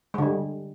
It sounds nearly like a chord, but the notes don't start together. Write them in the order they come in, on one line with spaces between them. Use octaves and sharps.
G#3 D3 G3